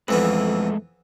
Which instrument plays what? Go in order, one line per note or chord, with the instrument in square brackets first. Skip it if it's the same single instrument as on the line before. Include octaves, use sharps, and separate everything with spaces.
[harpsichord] F2 E3 B3 [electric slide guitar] G#3 A3 B4